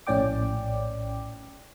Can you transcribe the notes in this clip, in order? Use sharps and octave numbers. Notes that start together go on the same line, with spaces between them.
A#1 A2 C#4 D5 G5 D6